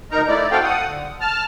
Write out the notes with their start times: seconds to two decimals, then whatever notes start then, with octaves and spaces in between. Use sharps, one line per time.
0.11 D2 D#4 A#4 A#5
0.28 A3 E4 D5
0.51 C4 F#4 A4 F5 G5
0.63 F#5 D#6
0.86 D3
1.21 A5 F6